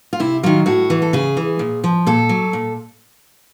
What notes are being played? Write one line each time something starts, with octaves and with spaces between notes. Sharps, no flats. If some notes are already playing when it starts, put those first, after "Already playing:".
F4
C3 E4
D#3 F#3 F4
A2 F#4
E3
A4
C#3 G#4
E3
A#2
F3
A#2 A4
F#3
A#2